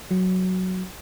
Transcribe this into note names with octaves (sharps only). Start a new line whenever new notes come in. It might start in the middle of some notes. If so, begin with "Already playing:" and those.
F#3